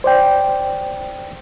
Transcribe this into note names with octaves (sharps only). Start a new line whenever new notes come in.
C5 D5 G5